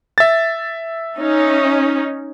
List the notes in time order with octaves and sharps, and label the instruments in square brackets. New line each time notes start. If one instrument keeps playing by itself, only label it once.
[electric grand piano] E5 A6
[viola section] C#4 D#4